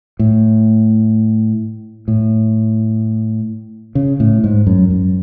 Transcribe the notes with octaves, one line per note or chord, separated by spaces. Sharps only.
A2
A2
C#3
A2
G#2
F#2
F#2